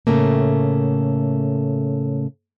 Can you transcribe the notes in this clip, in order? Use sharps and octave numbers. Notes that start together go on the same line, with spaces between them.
A2 C#3 A3 A#3